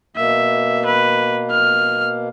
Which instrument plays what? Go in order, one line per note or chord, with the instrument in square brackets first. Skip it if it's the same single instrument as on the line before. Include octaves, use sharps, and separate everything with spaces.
[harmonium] B2 A#3 [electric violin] E5
[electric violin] B4
F6